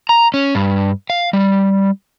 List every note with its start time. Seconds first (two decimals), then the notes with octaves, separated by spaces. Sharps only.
0.09 A#5
0.34 C#4
0.55 G2
1.10 F5
1.33 G3